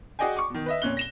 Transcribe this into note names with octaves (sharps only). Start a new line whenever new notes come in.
F#4 G#4 D5 D#5 G5 G#5
C#6 D6
B2 D#3
B4 D#5 E5
F2 A#2 C#4 F#6 G7
A#6 E7 G7